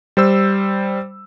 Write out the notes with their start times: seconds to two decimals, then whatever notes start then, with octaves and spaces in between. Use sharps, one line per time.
0.17 G3 C5 E6